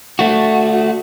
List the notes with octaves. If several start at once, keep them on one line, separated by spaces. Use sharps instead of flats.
A3 F#4